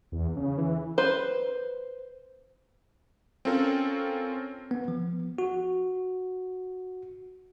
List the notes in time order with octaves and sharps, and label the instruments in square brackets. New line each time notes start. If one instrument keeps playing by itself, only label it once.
[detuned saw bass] E2
C#3
E3
[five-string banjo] B4 C5
[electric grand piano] C4 C#4 F4 A4 A#4
[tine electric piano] B3
F3
F#4